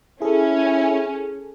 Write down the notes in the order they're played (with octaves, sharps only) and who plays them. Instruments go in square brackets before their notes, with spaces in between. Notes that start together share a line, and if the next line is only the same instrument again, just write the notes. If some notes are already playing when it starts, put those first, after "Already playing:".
[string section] C#4 [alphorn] E4 [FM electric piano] G#4 A4